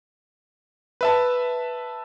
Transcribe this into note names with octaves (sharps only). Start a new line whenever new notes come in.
B4 E5 A5